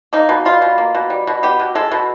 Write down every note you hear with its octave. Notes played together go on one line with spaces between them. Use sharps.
A#3 D#4
B2
G3 F4
B2
A#3
B2
G3
B2
B3 G4
B2
G#3 A4
B2